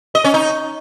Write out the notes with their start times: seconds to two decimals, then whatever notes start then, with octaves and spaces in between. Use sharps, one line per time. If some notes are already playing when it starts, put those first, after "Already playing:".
0.15 D#5
0.24 C#4
0.34 D#4